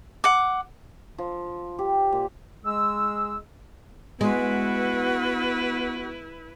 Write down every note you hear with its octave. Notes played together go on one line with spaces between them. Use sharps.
F#5 D6
F3
G4
A#2
G#3 E6
G#3 B3 E4 F#4 B4